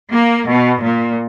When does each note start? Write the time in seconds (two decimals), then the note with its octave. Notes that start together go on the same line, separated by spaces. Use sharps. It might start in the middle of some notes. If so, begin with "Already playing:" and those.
0.12 A#3
0.47 B2
0.82 A#2